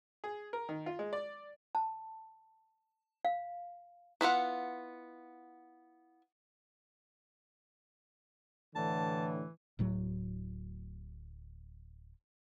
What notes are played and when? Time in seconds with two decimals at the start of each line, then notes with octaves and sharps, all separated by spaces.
0.24 G#4
0.53 A#4
0.69 D#3
0.86 F4
0.99 G#3
1.13 D5
1.75 A5
3.25 F5
4.21 B3 E4 F4 F#5
8.75 A2 D3 E3 A5
9.79 D1 A2 F#3